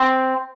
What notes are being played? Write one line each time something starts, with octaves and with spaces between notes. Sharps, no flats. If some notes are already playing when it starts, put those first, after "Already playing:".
Already playing: C4